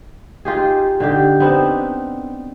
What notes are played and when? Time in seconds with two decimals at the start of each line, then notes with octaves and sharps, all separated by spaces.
0.45 D#4 F4 G4 G#4
1.00 D3 D#4 G4
1.40 B3 C4 D4 D#4